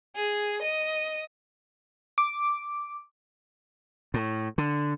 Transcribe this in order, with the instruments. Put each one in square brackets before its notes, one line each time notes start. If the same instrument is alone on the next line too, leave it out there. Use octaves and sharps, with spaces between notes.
[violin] G#4
D#5
[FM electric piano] D6
[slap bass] A2
D3